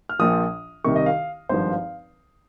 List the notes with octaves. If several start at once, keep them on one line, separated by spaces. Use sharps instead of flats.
F6
A#1 A#2 F3 D#6
C2 C3 D#3 C#6
D#5
F5
G#1 G2 F3 C5
F5